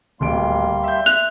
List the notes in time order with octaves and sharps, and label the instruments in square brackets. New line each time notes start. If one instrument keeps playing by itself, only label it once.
[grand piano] D1 D7 [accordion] G3 A#3 C6
[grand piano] E5 G6
[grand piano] E5 [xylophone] F#6 F7